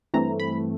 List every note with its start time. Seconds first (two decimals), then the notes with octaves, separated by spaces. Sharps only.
0.14 G2 E3 A3 C4 A#5
0.40 B5